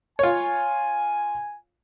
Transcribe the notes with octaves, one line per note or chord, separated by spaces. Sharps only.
F4 C#5 G#5